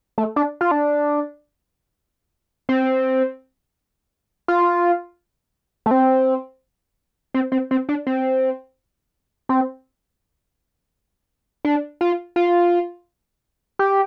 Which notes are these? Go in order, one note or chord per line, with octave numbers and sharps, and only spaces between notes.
A3
D4
F4
D4
C4
F4
A3
C4
C4
C4
C4
D4
C4
C4
D4
F4
F4
G4